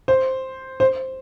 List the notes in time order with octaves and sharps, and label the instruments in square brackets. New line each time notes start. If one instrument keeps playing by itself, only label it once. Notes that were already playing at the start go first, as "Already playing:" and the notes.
[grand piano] C5
C5